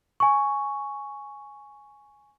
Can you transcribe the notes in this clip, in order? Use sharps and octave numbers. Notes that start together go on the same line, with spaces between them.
G#5 C#6